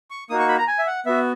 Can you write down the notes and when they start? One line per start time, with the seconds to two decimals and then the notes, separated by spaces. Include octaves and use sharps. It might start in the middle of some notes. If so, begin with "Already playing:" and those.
0.11 C#6
0.30 A#3 D#4 F#4 D#6
0.39 C#6
0.49 B5
0.58 A#5
0.68 G#5
0.79 E5
0.87 F#5
1.06 B3 F#4 E5